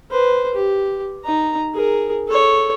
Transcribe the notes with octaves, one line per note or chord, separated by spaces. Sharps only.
B4 C5
G4
D#4 A#5
G#4 A#4
A4 C#5